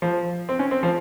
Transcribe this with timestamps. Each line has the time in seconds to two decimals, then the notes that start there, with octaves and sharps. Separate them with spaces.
0.02 F3
0.49 C4
0.59 C#4
0.71 C4
0.83 F3